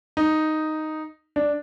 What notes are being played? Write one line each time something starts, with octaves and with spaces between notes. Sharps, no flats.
D#4
D4